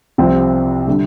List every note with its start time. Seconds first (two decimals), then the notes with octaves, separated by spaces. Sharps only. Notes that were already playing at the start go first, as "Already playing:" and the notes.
0.18 C2 C3 F3 C4
0.87 D3 G3 D4